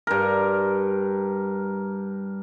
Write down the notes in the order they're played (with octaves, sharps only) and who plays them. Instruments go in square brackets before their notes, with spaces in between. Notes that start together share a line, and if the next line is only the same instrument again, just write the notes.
[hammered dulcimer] G2 A#4